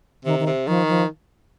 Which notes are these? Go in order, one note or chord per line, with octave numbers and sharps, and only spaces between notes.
C3 D#3
D#3
C3
D#3 F3
F3